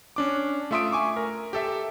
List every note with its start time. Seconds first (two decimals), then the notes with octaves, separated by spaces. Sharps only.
0.16 C#4 D4 D6
0.71 A3 F4 E5 C6 D#6 D7
0.92 G#5 C#6 D6
1.16 A#4
1.53 G4 A4 E5